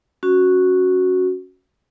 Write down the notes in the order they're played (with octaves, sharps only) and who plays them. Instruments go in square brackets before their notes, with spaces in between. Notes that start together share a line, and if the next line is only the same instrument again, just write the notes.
[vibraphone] C#4 F#4